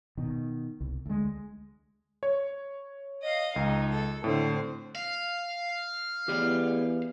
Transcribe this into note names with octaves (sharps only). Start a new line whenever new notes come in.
B2 D#3
C2
D2 G#3
C#5
D#5 F5
C#2 D#4
A4
A2 D3 C4 C5
F5
E3 B3 G4 G#4 D5